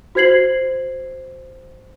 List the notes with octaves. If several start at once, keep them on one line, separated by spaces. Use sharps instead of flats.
F#4 C5 G#6 C7 F#7